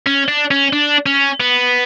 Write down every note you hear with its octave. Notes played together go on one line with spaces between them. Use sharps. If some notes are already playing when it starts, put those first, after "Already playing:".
C#4
D4
C#4
D4
C#4
B3